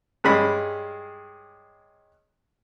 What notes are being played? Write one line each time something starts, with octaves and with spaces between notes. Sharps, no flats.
G2 G#3 C#4 B5